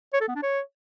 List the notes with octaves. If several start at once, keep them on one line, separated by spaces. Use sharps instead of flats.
C#5
A4
B3
D4
C#5